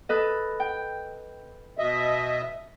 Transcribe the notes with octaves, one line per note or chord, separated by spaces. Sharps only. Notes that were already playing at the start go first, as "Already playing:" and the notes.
A4 B4 D#5
G5
B2 D#5 E5